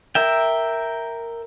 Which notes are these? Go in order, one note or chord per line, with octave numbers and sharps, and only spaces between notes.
A#4 E5 G5